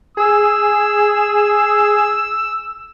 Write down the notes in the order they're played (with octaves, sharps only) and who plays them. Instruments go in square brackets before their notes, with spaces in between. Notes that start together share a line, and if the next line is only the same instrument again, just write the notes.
[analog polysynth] G#4 [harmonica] E6